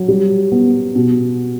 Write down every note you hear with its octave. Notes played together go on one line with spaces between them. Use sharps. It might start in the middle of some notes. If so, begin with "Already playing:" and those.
Already playing: F#3 C#4
G3
B3
B2